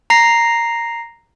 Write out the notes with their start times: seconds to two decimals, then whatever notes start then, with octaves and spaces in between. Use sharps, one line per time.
0.10 A#5 A#6 C7